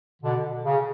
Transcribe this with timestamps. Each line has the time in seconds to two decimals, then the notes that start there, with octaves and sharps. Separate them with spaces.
0.23 B2 D3
0.65 C#3